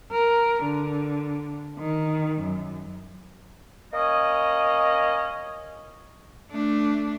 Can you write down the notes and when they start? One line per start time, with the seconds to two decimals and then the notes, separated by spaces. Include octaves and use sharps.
0.12 A#4
0.63 D3
1.79 D#3
2.42 F#2
3.94 A#3 C#4 D#5
6.51 A3 D4